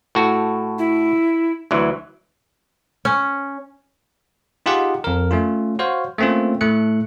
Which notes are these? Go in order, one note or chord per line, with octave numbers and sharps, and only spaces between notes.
A2 F#4 A4
E4
D2 E3 F#3
C#4
D#4 F4 G4 G#4 F#5
F2 A#4
A3 C#4 F4
F#4 C5 C#5 F5
A3 A#3 C4 C#4 F4
A2 A3 F#6 C#7